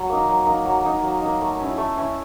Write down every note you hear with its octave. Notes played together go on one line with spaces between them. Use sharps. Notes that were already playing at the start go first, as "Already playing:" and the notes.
Already playing: F#3
A#3 D#4
F#3
A#3 D#4
F#3
A#3 D#4
F#3
A#3 D#4
A3
C#4 E4
A3
C#4 E4